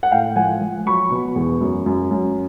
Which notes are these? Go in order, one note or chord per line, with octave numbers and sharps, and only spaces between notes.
F#5
A2 F5 G5
F3 F#5 G#5
F3
F#3 B5 C#6
B2
E2
F#2
F#2
F#2